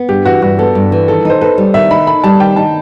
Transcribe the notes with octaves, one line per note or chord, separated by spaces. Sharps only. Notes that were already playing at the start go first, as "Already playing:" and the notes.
Already playing: B3
G2 G4
E3 F#4
G2 F#4
B3 A4
G2
E3
D#3 A4
D#4 C5
A4 B4
G3
D#3 E5
D#4 B5
A4 B5
G3 A5
D#3 G5
D#4 A5